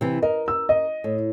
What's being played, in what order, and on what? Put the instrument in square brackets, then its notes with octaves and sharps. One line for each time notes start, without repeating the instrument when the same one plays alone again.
[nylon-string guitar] C3 E3
[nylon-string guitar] A#4 [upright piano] D#5
[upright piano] E6
D#5
[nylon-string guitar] A2